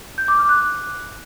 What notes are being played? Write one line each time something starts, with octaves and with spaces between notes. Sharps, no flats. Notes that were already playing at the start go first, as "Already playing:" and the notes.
G6
D6
F6
F#6